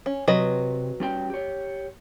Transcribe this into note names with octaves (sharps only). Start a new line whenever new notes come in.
C#4
C3 F#3 B4 D#5
G3 C#4 G5
G4 C#5